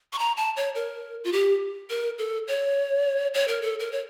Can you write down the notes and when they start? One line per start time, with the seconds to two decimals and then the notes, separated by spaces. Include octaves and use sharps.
0.13 C#6
0.19 A#5
0.37 A5
0.56 C#5
0.75 A#4
1.24 F4
1.32 G4
1.90 A#4
2.18 A4
2.47 C#5
3.34 C#5
3.48 A#4
3.61 A4
3.79 A#4
3.92 C#5